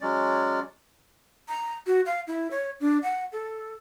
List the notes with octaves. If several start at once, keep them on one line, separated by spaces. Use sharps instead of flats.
F#3 G#3 C#4 D5
A#5
F#4
F5
E4
C#5
D4
F#5
A4